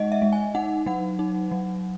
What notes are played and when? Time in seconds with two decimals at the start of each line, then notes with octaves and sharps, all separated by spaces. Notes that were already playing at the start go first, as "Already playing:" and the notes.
Already playing: G#3 D#4 D#5 F#5
0.12 E5
0.22 G#3
0.33 G#5
0.55 D#4 F#5
0.86 F#3 F#5
1.19 D#4
1.52 F#3